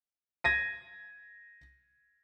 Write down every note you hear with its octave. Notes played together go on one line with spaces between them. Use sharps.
G#6 A#6 D#7